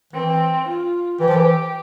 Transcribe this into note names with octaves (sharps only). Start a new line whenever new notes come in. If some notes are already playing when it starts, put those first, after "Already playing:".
E3 C4
F4
E3 G4
F3
E3